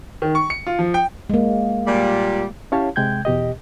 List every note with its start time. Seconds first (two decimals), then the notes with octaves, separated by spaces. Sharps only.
0.22 D#3
0.35 C#6
0.50 C#7
0.67 F4
0.79 F3
0.94 G5
1.30 G#3 A#3
1.87 A#2 G3
2.72 C#4 E4 G4 C#5 F5 A5
2.96 C3 G#3 G5 G6 G#6
3.25 E2 B2 G4 D#5